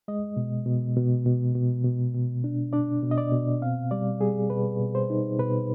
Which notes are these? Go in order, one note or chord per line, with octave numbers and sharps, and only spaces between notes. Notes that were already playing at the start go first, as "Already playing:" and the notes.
G#3 D#5
B2
B2
B2
B2
B2
B2
B2
D4
D4 D5
B2
D#5
D5
B2
C4 F5
G3 D5
G3 G#4
B2 B4
B2
C5
D#4
B2 B4